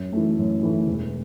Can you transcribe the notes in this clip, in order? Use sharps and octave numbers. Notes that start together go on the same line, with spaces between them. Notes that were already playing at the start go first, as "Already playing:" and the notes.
Already playing: F#2
E3 A3
F#2
E3 A3
E1